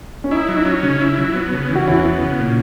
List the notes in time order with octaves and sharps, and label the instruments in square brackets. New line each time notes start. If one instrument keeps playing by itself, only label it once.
[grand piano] C#4
[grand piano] D#4 [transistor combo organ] E4
[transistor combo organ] F#3
[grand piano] D#4
[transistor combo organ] C#4
C#3
E4
F#3
B3
C#3
E3
[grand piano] F#4
[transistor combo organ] E2 [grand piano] C#4 E4
[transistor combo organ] B3
C#3
A#2